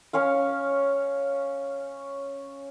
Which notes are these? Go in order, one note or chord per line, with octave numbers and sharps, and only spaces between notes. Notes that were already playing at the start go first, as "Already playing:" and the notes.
C#4 C#5 F5